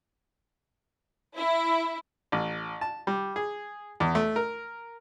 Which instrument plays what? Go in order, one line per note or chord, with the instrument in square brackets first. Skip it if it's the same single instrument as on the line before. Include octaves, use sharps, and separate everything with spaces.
[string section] E4
[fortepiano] A1
A5
G3
G#4
E2
A3
A#4